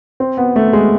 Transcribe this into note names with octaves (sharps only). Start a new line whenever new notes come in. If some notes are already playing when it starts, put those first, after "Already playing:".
C4
B3
A3
G#3